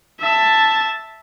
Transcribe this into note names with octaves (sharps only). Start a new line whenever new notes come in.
E5 A5